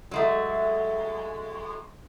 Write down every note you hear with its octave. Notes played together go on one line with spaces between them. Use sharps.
F#3 G#3 A3